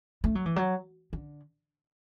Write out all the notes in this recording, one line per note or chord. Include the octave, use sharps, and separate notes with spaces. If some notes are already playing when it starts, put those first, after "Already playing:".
A3
F#3
E3
F#3
D3